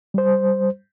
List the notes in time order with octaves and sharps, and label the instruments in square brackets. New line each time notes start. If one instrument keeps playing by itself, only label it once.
[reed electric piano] G3 C5